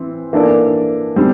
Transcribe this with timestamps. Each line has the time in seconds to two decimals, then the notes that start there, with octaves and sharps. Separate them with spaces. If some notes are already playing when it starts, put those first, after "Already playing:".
Already playing: E3 C4
0.33 E3 A#3 D4 A4 D5
1.16 D3 G3 C4